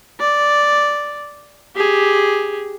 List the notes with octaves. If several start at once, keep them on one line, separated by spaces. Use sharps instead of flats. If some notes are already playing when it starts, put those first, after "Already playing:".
D5
G4 G#4